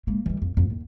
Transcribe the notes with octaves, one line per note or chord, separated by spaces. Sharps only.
G#3 A#3
E3 G3
F2
F2
D#2